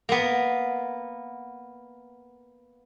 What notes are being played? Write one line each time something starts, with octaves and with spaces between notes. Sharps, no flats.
A#3 B3